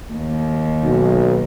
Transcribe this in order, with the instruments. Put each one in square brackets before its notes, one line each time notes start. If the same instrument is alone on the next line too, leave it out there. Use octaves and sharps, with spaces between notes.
[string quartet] D#2
[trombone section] B1